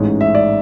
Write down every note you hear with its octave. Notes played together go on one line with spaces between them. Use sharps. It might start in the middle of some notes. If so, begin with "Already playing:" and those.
Already playing: A1 G#2 G#3 C#4
E5
D5